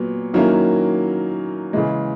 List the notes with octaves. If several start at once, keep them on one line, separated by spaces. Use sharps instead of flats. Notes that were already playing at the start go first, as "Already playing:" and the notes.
Already playing: A#2 F#3 B3
D#3 F#3 A#3 C#4 E4
C#3 E3 G#3